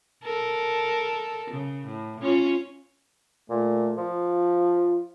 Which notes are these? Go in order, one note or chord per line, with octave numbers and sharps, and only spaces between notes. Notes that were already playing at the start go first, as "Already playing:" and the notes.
A4 A#4
C#3
A2
C#4 F4 C#5
A#2 A3
F3 F4